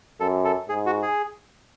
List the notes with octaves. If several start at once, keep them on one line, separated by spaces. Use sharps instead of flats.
F#2 A4
A4
G#2 G#4
F#4
G#4